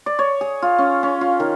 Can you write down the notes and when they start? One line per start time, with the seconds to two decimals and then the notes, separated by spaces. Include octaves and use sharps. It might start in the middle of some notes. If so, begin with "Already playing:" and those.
0.06 D5
0.19 C#5
0.41 G#4
0.62 F4
0.78 C#4
1.03 C#4
1.21 F4
1.40 D#3